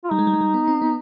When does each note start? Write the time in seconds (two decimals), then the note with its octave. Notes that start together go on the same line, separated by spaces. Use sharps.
0.04 F4
0.11 G3 D#4
0.19 G#3
0.27 G3
0.34 G#3
0.41 G3
0.54 B3
0.68 C4
0.82 B3